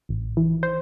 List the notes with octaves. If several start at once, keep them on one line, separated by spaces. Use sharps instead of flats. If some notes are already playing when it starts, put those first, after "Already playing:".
A1
E3
C5